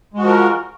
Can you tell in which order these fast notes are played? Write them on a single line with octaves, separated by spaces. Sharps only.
G#3 F#4 F3 A#4